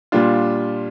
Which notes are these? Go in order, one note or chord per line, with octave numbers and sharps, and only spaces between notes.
A#2 G3 D4 F4